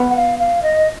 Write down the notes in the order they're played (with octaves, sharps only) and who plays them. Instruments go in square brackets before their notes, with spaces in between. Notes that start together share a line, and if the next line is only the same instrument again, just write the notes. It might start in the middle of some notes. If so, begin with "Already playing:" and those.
Already playing: [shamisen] B3
[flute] F#5
F5
F5
D#5